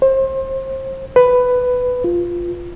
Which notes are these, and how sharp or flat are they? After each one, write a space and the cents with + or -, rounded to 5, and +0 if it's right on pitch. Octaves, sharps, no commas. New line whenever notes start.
C5 +30
B4 +10
F4 -5